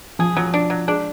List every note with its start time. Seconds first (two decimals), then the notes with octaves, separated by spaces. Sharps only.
0.19 F3 G#4
0.36 F3 F#3
0.54 D4
0.70 F#3
0.87 G#3 D4